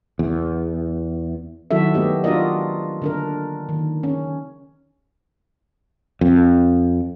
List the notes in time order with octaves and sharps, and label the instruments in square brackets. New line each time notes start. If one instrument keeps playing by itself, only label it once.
[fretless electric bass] E2
[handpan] D#3 F#3 E4 F#4 A4 E5
A3 B3 G4 D#5
D4 F4 F#4 A#4 D5 D#5
D3 D4 A#4
D#3
C#4
[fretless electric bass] F2